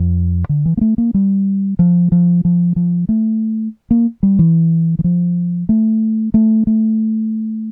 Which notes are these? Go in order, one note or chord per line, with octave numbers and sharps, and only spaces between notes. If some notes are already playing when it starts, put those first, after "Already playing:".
Already playing: F2
D3
E3
A#3
A3
A#3
G3
F3
F3
F3
F3
A3
A#3
G3
E3
E3
F3
A3
A3
A3